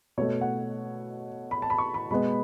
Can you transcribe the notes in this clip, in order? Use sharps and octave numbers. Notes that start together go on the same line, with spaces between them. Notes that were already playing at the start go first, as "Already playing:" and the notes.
B2 A3 C#5
F#5
B5
A5
B5
C#6
B5
B2 G#3 B3 B5